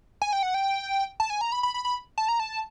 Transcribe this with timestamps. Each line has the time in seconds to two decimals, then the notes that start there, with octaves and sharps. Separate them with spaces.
0.22 G#5
0.33 G5
0.43 F#5
0.54 G5
1.20 A5
1.30 G#5
1.41 A#5
1.52 B5
1.63 B5
1.74 B5
1.85 B5
2.18 A5
2.28 A#5
2.40 A5